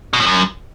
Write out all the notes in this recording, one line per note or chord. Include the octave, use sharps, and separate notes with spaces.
B2
A2
F#2